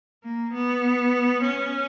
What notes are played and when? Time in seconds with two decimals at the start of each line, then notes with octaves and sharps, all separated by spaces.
0.24 A#3
0.53 B3
1.43 C#4